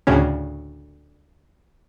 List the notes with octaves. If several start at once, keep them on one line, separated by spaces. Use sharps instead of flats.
D2 A2 C#3 C#4